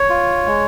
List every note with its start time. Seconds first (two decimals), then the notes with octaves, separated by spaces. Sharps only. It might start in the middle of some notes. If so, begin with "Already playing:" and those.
Already playing: C#5
0.10 F4
0.46 G#3